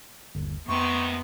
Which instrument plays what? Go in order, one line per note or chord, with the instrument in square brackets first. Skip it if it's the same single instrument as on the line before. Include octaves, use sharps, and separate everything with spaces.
[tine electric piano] G1 D#2
[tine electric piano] F2 C6 [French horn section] G#2 C3 D#3 [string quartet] B3 [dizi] C#6